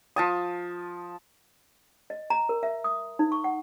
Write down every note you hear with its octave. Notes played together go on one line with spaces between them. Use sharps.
F3 A5 D#6
D#5
A#5
A#4
E5
D#6
D#4
C#6
F#5